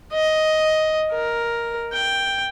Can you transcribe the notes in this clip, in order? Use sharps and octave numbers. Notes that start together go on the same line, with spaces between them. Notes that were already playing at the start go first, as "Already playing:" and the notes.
D#5
A#4
G5